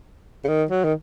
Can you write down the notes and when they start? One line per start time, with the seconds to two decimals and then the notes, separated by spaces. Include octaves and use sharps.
0.44 C#3
0.48 D#3
0.70 F#3
0.84 D#3